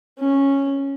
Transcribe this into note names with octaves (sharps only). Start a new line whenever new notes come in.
C#4